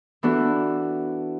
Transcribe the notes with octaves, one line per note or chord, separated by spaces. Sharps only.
E3 B3 D4 F#4 A4